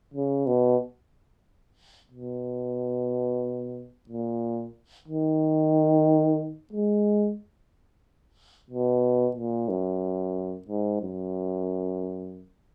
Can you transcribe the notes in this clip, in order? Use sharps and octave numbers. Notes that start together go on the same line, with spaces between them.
C#3
B2
B2
A#2
D#3
G#3
B2
A#2
F#2
G#2
F#2